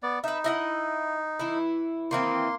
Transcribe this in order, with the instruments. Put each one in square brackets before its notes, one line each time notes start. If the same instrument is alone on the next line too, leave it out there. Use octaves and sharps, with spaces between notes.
[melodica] B3 D5
[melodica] D#4 [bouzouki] B4 E5
[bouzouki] E4 D#5 F#5
E3 E4
[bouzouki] D#3 E3 C4 [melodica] A#3 C6